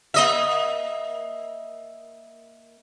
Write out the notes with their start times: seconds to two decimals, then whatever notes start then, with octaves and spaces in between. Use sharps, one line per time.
0.14 A#3 D#5 E5